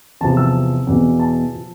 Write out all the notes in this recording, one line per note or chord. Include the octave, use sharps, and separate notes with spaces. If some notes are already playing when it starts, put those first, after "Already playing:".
E2 C3 F3 A5
E6
E2 B2
A5
F3